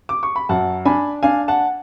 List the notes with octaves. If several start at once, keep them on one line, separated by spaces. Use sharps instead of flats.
D6
C#6
B5
F#2 F#5 A5
D4 G#5 B5
D4 F5 G#5
F#5 A5